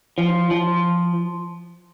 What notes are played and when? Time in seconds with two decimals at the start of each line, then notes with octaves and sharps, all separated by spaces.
0.18 F3
0.51 F3